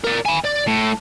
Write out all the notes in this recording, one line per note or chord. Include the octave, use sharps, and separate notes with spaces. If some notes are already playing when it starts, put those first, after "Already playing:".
A#4 D5
G#5 B5
D5
A2